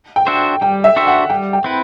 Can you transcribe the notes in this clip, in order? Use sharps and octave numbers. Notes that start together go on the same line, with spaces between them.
G5
D4 F#4 C5 E5
G3 G5
E5
D4 F#4 C5 E5
F#5
G3 G5
G5
C4 E4 B4